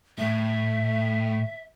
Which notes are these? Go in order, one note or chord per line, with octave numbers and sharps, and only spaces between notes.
A2 E5